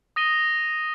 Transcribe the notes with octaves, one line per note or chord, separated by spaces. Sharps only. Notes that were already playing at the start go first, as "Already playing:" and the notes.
D#6 A#6 D#7 G7